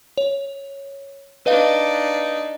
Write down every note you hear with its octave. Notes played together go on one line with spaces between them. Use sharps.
C#5
D4 D#4 B4 D#5 F5